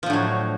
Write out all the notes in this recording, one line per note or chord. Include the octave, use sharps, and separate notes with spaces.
A2 D3 F3 F#3